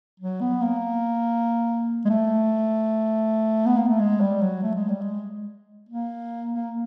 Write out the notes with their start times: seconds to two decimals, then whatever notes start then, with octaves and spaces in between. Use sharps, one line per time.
0.20 F#3
0.41 B3
0.62 A#3
2.05 G#3
2.09 A3
3.66 B3
3.77 A#3
3.88 A3
3.99 G#3
4.21 G3
4.41 F#3
4.63 A3
4.75 G#3
4.88 G3
5.01 G#3
5.89 A#3
6.52 A#3